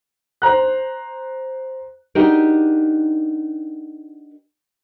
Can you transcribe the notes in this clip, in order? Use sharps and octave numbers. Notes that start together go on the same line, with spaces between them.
C5 A#5 F#6
D4 D#4 F#4 G4 A#4